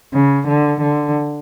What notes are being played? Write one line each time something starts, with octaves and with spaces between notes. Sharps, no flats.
C#3
D3
D3